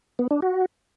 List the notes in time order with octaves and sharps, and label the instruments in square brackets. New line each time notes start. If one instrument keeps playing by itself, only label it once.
[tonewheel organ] B3
D4
F#4